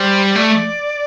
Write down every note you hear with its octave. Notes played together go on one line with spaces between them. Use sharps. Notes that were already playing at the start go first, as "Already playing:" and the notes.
Already playing: G3 C5
A3 D5